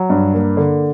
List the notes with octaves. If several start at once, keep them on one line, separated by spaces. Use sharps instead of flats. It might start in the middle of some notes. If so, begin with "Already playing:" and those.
Already playing: F#3
G2
A#3
D3